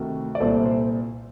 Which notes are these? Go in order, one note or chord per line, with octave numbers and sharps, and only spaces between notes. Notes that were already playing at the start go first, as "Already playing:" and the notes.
Already playing: D2 C3 D#3 F#4 A4
D5
C2 A#2 A4 C5
C5